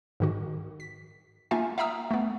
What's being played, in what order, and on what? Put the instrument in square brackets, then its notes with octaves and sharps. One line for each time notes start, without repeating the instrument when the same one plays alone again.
[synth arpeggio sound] G#2 D#3 F#4
B6
A#3 D#4 F4 E5 F5 G#5
E5 F5 G5 A#5 D#6 E6
A3 B3